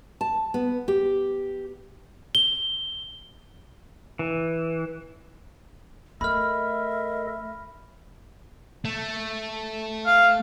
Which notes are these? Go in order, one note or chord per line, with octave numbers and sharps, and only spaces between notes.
A5
B3
G4
G7
E3
A3 A4 A#4 D#5 E5 B5 F6
A3
F5